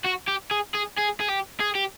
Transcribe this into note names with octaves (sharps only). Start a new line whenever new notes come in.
F#4
G4
G#4
G#4
G#4
G#4
G4
G#4
G4